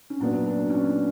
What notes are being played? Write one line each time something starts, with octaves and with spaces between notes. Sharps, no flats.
C#4
A#2 F#3 B3 D4
D4
C#4
D4